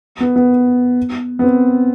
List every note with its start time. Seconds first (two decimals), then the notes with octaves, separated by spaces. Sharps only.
0.20 B3
0.36 B3
1.39 B3
1.44 C4